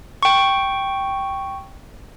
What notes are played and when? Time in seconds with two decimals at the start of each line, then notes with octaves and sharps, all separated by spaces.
0.23 G5 C#6